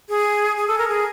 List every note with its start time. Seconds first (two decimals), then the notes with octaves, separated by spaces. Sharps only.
0.09 G#4
0.57 G#4
0.67 A4
0.78 A#4
0.88 G#4